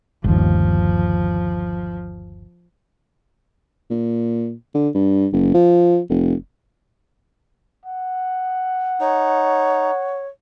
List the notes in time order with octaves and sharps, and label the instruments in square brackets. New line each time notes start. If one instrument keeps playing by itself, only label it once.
[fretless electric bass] G1 D#2 [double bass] F3
[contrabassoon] A#2
D3
G2
F#1
F3
F1
[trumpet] F#5
[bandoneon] D#4 [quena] C#5